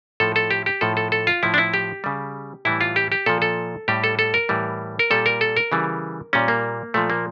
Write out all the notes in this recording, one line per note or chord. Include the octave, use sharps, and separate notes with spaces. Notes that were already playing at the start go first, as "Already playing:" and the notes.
A2 F3 A4
A4
G4
G4
A2 F3 A4
A4
A4
F4
A2 F3 E4
D4
E4
G4
C#3 G3
A2 E3 G3 E4
F4
G4
G4
A#2 F3 A4
A4
A2 G3 G4
A4
A4
A#4
A2 E3 G3
A#4
A#2 G3 A4
A#4
A4
A#4
C#3 E3 G3
A#2 G3 C#4
A#3
A#2 F3 A3
A#3